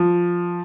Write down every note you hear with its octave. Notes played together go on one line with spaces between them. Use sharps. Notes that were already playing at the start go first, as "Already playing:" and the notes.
Already playing: F3